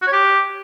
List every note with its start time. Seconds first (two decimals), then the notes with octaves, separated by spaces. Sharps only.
0.02 F#4
0.07 C#5
0.13 G4